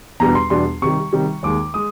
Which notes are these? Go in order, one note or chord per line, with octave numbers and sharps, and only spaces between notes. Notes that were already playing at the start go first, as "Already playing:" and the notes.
E2 B2 G3 B3 D4 A#5
C6
E2 B2 G3 B3 D4 C6
C3 D#3 G3 C#6
C3 D#3 G3
D#2 D#3 G#3 D6
G#3 D#6